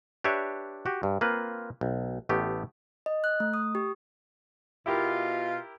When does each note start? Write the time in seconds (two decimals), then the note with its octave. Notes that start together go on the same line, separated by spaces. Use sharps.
0.24 D4 G4 B4 C#5 E5
0.86 F#4 G4
1.03 G2
1.21 A#3 C4 F4 B4
1.81 B1
2.29 A1 A3 B3 G4
3.06 D#5
3.24 F#6
3.40 A3
3.54 D#6
3.75 G4
4.86 B2 E4 F4 G4 A#4